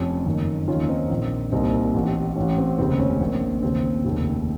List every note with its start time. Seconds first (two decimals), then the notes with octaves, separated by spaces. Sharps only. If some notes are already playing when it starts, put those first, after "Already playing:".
Already playing: F1 F2 C3 C#4 F4
0.26 F#1 F2 D#3
0.68 D#2 D#3 C#4 F4
0.89 C4 D#4
1.10 A#1 A#2
1.52 C2 A#2 C4 D#4
1.94 A1 A2
2.36 A1 A2 C#4
2.58 C4
2.78 F1 D#2 C#3 C4
2.99 C#4
3.20 A#1 A#2 C4
3.62 D#2 C#3 C4
4.05 F1 D#2 C#3